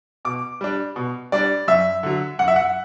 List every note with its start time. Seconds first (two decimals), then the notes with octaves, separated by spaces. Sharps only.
0.25 B2 D6
0.61 G3 D4
0.96 B2
1.32 G3 D4 D5
1.68 F#2 E5
2.03 D3 F#3
2.39 F#2 F#5
2.48 E5
2.56 F#5